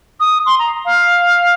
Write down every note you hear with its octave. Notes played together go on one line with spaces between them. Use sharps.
D#6
C6
A#5
F5